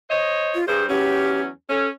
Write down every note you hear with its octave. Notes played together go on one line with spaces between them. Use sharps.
C5 C#5 D#5
F4
G2 G#4 C5
E2 F#3 C#4 G4
C#4 A4